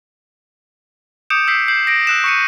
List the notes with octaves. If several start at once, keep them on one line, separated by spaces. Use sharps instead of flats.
D6 D#6 G6 C#7 D7 E7
E6 G6 B6 C7
G6 C7 F#7
A#6 D7
E6 F#6 E7
C#6 C#7 D#7